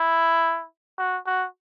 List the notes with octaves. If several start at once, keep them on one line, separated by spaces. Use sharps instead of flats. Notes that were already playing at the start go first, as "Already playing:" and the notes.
Already playing: E4
F#4
F#4